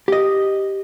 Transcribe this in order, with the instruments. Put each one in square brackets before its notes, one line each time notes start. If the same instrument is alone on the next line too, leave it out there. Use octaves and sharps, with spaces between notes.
[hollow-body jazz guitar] G4 D#5